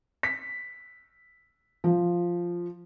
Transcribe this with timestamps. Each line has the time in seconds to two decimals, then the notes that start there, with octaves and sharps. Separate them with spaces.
0.23 B6
1.84 F3